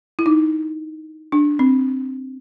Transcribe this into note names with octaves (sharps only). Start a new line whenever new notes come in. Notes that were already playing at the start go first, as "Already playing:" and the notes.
E4
D#4
D4
C4